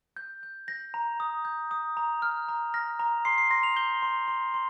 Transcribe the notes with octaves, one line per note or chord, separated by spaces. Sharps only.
G6
G6
G6 A#6
A#5
D#6
G6
D#6
A#5
F6
A#5
F6 A#6
A#5
C6 C7
C7
C6 A#6
F7
G6 G7
C6
C6
C6